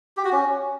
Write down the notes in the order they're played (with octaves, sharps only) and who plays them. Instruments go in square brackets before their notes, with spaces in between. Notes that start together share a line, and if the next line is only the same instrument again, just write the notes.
[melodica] G4
F#4
C#4